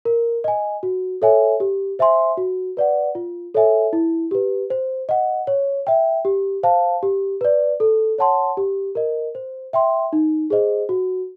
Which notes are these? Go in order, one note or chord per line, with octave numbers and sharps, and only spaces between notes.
A#4
D#5 G#5
F#4
A4 C#5 E5 G#5
G4
C5 E5 G#5 C6
F#4
B4 D5 F#5
F4
A4 C#5 E5 G#5
E4
G4 B4
C5
D#5 F#5
C#5
E5 G5
G4
C5 F5 A5
G4
B4 D5
A4
C#5 F#5 A5 C6
G4
A#4 D#5
C5
E5 G5 C6
D#4
G#4 C5 D#5
F#4